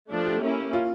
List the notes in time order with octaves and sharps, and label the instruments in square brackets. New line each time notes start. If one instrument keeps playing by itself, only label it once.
[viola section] F3 A3 D4 [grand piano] A4
[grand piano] G4
[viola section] A#3 C#4 E4
[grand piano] F4